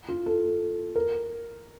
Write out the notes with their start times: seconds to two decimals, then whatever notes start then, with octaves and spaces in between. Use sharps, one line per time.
0.09 F4
0.26 A4
0.96 A#4